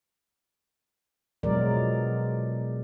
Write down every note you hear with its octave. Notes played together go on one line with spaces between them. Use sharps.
B2 F3 F#3 G#3 A#4 D5